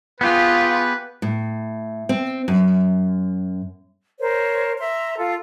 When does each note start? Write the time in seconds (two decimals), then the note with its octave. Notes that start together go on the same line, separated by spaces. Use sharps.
0.21 B3 F4 G4 G#4 B4
1.22 A2
2.09 C4
2.48 F#2
4.20 A#4 C5 C#5
4.79 E5 A#5 C6
5.19 F4 A4